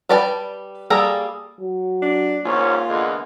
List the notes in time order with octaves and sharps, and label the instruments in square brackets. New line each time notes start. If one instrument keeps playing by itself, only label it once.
[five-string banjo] G3 B4 D5 G5 A5
G3 A#3 G#4 A4 A#5
[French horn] F#3
[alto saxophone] D4
[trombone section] C2 G#2 C#4 [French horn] A#3 [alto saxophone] F4
[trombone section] E2 D3 G#3